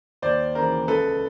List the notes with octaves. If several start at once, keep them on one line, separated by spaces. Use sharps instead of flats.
D#2 C5 D5
C#3 E3 A#4 C5
C#2 A4 B4